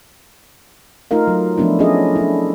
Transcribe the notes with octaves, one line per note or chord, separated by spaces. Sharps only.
A3 D#4 F4 A#4 F5
F#3
F3 A3 B3 D4 E4
C#4 D4 E4 G#4 A4 D#5
D4 E4